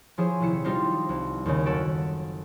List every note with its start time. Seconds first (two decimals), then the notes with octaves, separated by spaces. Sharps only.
0.18 F3 E4 G#4 C5 C#5
0.40 D#1 C3 E4 C#7
0.64 G3 D4 D#4 F4 G4 C5
1.09 C2
1.46 D#2 C#3
1.66 F#1 F#4 A4 D7